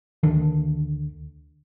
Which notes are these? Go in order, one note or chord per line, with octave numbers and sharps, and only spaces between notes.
D2 D#3 D4